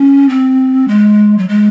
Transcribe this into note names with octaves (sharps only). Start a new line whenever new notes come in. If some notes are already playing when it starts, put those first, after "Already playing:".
Already playing: C#4
C4
G#3
F#3
G#3